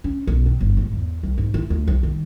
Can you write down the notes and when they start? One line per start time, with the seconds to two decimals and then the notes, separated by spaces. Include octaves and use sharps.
0.04 C#4
0.27 B1
0.46 C4
0.61 G1
0.77 G#2
0.93 E2
1.23 C2
1.38 G#2
1.54 E4
1.70 D2
1.87 C2
2.03 D#3